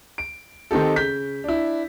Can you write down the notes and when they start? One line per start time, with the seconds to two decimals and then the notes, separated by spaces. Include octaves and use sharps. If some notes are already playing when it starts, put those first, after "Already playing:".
0.18 D7
0.71 D#3 C4 D#4 G4 A4
0.96 C#3 G6 B6
1.44 D4 E4